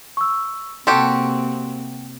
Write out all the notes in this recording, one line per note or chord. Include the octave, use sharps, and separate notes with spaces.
C#6 E6
C3 A#3 C4 F#4 G4 A4 C6